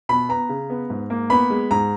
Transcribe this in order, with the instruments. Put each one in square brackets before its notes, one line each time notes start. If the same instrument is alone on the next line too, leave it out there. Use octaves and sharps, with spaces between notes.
[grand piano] B2 B5
B3 A#5
C#3
B3
G#2
A#3
B3 B5
G#3
G#2 A#5